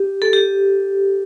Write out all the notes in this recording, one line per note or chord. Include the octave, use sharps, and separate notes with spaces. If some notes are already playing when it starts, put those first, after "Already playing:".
Already playing: G4
A4
G4